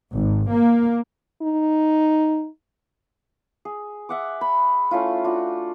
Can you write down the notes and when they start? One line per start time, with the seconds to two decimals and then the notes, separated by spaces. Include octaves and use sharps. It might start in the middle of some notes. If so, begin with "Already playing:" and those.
0.13 G#1
0.49 A#3
1.42 D#4
3.65 G#4
4.09 E5 F#5 D6
4.41 B5
4.91 A3 C#4 E4 F4
5.24 D4 F4 F#4